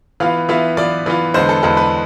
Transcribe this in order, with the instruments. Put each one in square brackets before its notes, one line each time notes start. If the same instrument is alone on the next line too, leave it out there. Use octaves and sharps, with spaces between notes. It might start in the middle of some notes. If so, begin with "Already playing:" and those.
[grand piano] E3 B3 F4 F5
E3 B3 F4 E5
E3 B3 F4 D5
E3 B3 F4
E2 D3 G#3 B3 C5
A4
E2 D3 G#3 B3 A4
B4